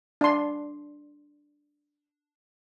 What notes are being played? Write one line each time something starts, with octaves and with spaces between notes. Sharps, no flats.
D4 C6